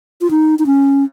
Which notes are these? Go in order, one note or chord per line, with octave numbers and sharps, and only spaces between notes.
F4
D#4
D#4
C#4